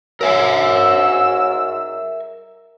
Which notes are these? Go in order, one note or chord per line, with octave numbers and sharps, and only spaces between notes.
G#2 F#3 A#4 E5 G#5 E6